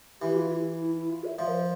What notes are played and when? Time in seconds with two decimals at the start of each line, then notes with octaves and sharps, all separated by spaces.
0.21 E3 G4
0.36 F4
0.51 E4
0.80 E4
0.95 E4
1.10 F4
1.25 E5
1.39 F3 E5
1.48 A#4
1.54 C5